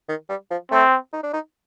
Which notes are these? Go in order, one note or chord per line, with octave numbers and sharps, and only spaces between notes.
D#3
G3
F3
A3 C4
D#4
D4
D#4